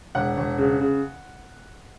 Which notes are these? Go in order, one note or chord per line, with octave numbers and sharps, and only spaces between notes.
E1 F#5
E1
C#3
C#3